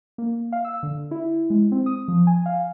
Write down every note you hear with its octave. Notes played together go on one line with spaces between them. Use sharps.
A#3
F5
E6
D3
E4
G#3
C4
D#6
F3
G#5
F5